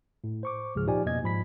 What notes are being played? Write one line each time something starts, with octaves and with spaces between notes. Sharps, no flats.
A2
C5 C#6 D6
C#2 G#2 F3 G#4 F6
A#2 F3 D#4 G4 D5 G#5
F2 B2 A#3 D#5 G#6
G#2 F3 B5 B6